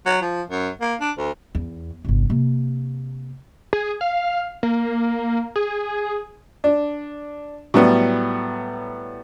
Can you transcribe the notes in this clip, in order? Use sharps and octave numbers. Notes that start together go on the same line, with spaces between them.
F#3
F3
F#2
A#3
D4
D2
E2
G1 C2
C3 A#3
G#4
F5
A#3
G#4
D4
A2 F#3 G3 B3